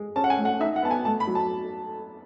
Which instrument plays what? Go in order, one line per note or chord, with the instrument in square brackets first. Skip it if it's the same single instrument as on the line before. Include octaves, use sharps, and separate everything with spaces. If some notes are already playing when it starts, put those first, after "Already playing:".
Already playing: [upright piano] G#3
C#4 A5
F#5
G#5
A3
F#5
D#4 E5
F#5
B3 A5
G#5
A3 A5
B5
F#3
A5